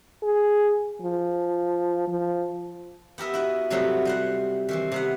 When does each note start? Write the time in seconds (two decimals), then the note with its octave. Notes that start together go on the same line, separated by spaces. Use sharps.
0.23 G#4
1.02 F3
2.08 F3
3.18 B3 G4 A#4 E5
3.34 E4 F#4 D#5
3.70 C3 F#3 G3 A3 B3 C4
4.05 G3 C5 F#5
4.69 D#3 E3 C4
4.92 C3 B3 F#5